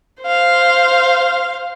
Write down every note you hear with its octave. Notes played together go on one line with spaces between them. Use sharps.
C5 F5